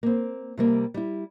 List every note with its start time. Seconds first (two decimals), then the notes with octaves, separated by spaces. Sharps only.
0.03 A#3 C4
0.57 C3 G3 A#3
0.94 G3 E4